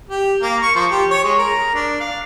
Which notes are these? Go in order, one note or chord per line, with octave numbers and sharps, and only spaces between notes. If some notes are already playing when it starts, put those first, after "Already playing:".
G4
A#3
C#6
F3
G4
C#5
G#3
A#4
D4
F5